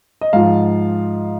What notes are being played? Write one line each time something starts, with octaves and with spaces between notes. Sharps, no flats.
D#5
G#2 F3 F5